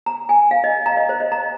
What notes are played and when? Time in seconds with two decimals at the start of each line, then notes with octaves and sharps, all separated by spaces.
0.06 A#5
0.29 G#5
0.51 F5
0.64 D#5
0.86 A#5
0.92 F5
0.97 D#5
1.09 C5
1.20 D#5
1.32 A#5